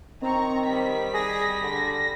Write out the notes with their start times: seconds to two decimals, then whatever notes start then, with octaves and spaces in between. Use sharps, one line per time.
0.22 D#3 C4 A#5 C#6
0.67 G3 B6
1.14 G#4 A#6
1.63 D3